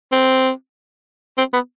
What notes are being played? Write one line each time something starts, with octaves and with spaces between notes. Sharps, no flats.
C4
C4
B3